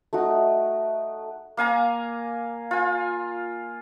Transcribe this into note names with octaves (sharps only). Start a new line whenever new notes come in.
A3 D#4 F#4
A#3 F5 G#5 A#5
F4 G#5